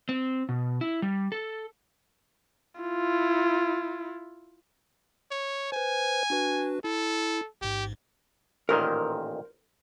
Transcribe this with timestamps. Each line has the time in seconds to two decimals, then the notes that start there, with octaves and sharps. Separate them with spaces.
0.09 C4
0.49 B2
0.81 E4
1.02 G3
1.32 A4
2.81 E4 F4
5.31 C#5
5.72 B4 C5 G#5
6.30 D4 F#4 B4
6.84 E4 A4
7.61 A1 G#2 G4
8.69 A1 A#2 D#3 A#4 C5